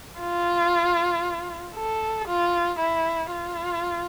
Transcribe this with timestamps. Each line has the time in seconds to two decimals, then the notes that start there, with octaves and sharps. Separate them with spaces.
0.19 F4
1.75 A4
2.28 F4
2.79 E4
3.31 F4